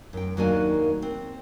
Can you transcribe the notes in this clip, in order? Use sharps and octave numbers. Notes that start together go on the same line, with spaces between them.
F#2 G5
D#2 F#3 A#3 D4 G#5
C4